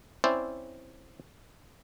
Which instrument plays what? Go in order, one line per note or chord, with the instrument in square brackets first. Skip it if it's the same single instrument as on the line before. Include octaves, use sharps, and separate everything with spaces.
[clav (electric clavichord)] C4 C#4 E4 C5 D5